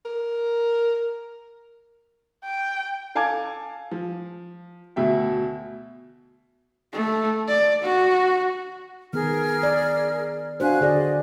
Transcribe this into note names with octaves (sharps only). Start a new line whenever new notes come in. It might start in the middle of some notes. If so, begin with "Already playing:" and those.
A#4
G5
A4 F5 G#5 A5 D6 G#6
F3
D2 B2 E5 G5
A3
D5
F#4
D#3 B3 G#4 A#4 F6
D5
D4 F#4 C5 F5 G#5 F#6
D3 G#4 D5 D#5